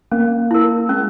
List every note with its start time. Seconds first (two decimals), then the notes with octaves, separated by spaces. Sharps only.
0.12 A#3 C#4
0.51 E4 A#4
0.89 G#3 C#4